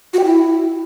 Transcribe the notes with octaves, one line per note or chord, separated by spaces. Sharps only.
F#4
G5
E4